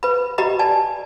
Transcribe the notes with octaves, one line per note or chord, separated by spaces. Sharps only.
B4 B5
F#4 G4 D#5 A#5 B5
D5 G#5 A5